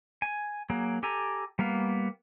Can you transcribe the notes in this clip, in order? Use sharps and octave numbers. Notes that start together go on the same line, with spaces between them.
G#5
F#3 A#3 G#4
G4 A4 G#5 A#5
G3 A#3 B3 F5